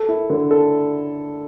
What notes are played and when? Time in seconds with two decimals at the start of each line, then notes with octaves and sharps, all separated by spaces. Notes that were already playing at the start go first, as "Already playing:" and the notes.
Already playing: A4
0.09 E4
0.30 D3
0.51 A4